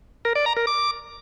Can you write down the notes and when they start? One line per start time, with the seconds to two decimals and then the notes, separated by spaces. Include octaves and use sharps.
0.25 A#4
0.36 D5
0.46 A#5
0.57 A#4
0.67 D6